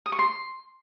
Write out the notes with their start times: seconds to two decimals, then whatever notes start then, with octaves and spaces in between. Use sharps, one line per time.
0.06 D#6
0.12 C#6
0.19 C6